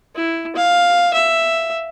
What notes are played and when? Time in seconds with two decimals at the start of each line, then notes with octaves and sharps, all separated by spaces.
0.15 E4
0.56 F5
1.13 E5